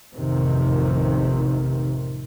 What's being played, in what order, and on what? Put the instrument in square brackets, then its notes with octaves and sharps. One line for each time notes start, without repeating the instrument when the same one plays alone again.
[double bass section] A1 F2 C3 D#3